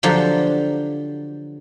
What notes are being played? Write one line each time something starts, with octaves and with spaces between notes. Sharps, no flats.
D3 F3 F#3 G4